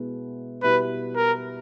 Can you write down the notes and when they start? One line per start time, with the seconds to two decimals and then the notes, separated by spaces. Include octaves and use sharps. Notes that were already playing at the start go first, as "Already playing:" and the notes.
Already playing: B2 G#3 B3 E4
0.63 B2 G3 B3 E4 G4 B4
1.16 A#4